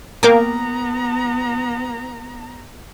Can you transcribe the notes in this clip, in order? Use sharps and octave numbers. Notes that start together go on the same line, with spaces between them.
A#3 B3 A#4 G5 A#5 D6